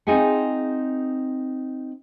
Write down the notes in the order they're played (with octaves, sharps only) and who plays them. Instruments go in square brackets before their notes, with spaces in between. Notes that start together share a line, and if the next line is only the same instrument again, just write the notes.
[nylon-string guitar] C4 D#4 F4 G#4 E5 F#5